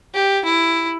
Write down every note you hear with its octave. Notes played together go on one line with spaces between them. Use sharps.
G4
E4